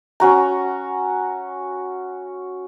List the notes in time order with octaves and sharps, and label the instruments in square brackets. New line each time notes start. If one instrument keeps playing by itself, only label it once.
[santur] C#4 F#4 A#5